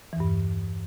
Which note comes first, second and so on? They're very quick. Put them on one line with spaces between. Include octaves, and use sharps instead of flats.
E3 E2 G2